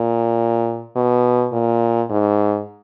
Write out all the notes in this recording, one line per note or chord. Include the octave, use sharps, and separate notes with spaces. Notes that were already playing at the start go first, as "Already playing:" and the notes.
Already playing: A#2
B2
A#2
G#2